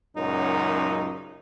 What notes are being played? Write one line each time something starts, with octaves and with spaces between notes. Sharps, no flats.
C#2 F#2 A#2 F#3 D#4